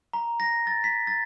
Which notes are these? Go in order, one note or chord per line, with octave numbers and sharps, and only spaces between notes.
A#5
A#6
A6
B6
A6